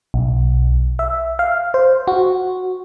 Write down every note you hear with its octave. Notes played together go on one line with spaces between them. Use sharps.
B1
E5
F5
C5
F#4